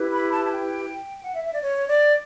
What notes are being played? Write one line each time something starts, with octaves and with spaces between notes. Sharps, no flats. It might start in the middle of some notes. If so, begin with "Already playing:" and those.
Already playing: E4 G4 B4
B5
A5
A5
G5
F#5
E5
E5
D5
C#5
D5